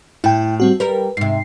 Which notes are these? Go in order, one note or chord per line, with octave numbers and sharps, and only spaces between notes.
A2 E4 G5
G3 C4 F#4
G3 A#4 B4
G#2 C3 C7